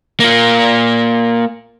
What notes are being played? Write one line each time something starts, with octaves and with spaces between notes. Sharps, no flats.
A#3 F4